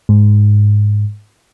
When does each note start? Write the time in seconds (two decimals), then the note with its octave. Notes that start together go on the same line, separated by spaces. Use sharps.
0.09 G#2